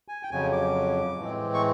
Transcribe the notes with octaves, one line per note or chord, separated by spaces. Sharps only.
G#5
G5
F2 C#3 F#3 G#5
D6
A2 E3 G#3 C4
C#6